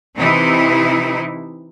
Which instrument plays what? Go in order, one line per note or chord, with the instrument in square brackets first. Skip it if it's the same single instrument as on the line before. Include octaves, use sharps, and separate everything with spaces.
[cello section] C3 E3 D#4 E4